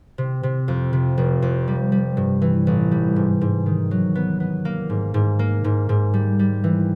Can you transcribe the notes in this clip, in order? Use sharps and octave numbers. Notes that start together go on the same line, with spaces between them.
C3
C3
F2
C3
F1
F2
G3
G3
G2
E3
A1
G3
G#2
G#2
D#3
F#3
B3
B3
A#3
G#2
G#2
A#3
G#2
G#2
G3
G3
E3